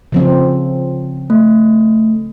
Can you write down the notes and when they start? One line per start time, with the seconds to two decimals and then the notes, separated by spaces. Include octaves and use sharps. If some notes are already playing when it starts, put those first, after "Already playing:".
0.12 C#3 F3 C4
1.30 A3